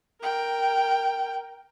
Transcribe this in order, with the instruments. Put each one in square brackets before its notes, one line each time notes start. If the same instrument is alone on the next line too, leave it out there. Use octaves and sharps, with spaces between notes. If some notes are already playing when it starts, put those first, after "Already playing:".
[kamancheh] A#4 G5